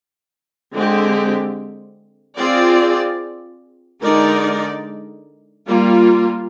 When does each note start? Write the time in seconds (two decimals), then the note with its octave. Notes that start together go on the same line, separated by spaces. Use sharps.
0.73 D3 G#3 C4 G4
2.37 C4 F4 G#4 D5
4.02 D3 G#3 D#4 A#4 D5
5.67 G3 A#3 F4